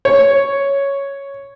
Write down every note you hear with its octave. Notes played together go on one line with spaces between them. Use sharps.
C#5